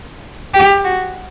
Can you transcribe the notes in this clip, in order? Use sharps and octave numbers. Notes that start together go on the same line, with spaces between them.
G4
F#4